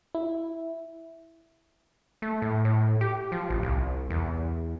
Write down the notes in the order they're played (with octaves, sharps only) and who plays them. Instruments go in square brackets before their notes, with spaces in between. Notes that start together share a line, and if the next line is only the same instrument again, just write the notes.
[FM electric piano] E4
[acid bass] A3
A2
A2
G4
F3
A1
C2
E2